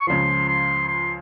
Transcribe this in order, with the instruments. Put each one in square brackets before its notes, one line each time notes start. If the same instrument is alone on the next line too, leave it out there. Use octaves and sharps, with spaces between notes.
[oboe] C#6
[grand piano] C#2 C#3 F3 [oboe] C6
[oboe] C6
C6